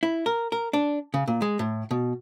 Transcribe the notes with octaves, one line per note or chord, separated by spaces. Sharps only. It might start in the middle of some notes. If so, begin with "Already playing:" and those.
E4
A#4
A#4
D4
C#3
A#2
G#3
A2
B2